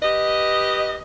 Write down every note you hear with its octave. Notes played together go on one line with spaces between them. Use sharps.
G4 B4 D#5